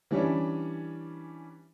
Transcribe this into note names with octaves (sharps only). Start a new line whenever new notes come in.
E3 G3 C#4 D4